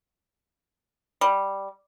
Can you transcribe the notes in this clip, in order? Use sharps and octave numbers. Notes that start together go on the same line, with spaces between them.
G3